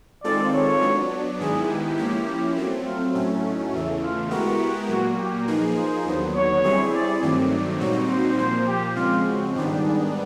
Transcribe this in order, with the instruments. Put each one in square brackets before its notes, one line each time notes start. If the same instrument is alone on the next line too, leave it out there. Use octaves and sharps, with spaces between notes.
[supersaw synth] D#3 G#3 C4 F4 A4 [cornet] D5
[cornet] C#5
[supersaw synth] F#3 B3 D4
[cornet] D5
[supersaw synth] G#2 D#3 G#3 B3 E4 [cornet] G#4
[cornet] G4
[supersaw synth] F3 A#3 C#4 E4
F#3 A3 C4
[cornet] F4
[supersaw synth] A2 F#3 A3 C#4 [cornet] E4
[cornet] D#4
[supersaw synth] E2 C#3 E3 A3 [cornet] E4
[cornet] F4
[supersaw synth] G#3 B3 E4 G4 A#4 [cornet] F#4
[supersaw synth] A#2 F#3 A#3 [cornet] F#4
[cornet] G4
[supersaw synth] F3 A#3 D#4 G#4 [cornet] B4
[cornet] C5
[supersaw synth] D#2 D3 F#3 B3
[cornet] C#5
[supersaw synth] G3 C4 E4 G#4
[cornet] D5
[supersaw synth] G2 D#3 F#3 A3 C4 [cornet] D5
[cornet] D5
[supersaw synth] A#2 G3 C4 D#4 F#4 [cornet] C#5
[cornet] C5
[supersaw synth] A#2 F3 A#3 [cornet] C5
[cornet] G4
[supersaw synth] C#3 F3 G#3 C4 [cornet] F4
[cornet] F#4
[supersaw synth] G#2 D#3 G3 B3 D4 [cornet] G4
[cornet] G#4